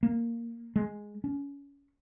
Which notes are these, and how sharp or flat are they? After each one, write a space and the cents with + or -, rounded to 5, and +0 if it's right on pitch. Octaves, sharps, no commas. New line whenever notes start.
A#3 -5
G#3 +0
C#4 +25